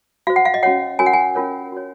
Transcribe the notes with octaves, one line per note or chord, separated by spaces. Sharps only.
F#4 C5 F5
F#5
F5
D#5
C#4 F#4 C#5 F#5
C#4 F#4 A#4 C#5 G#5
F#5
G#5
C#4 F4 A#4 C#5
F#4 C#5